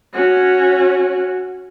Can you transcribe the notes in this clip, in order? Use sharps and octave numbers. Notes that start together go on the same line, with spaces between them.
C#4 F#4